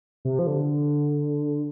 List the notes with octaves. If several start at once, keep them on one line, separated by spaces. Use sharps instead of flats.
C3
F3
D3